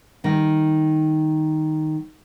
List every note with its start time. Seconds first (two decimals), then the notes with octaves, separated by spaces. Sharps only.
0.24 D#3 G3